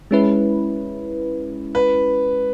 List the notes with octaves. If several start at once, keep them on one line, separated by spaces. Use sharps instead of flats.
G#3 C#4 E4 B4
B4